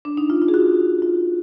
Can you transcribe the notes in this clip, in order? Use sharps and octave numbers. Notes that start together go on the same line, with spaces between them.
D4
D#4
F4
F4
G#4
F#4
F4